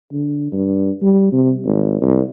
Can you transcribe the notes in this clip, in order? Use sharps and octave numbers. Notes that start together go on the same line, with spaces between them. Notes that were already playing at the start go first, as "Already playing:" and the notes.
D3
G2
G3
C3
G#1
C2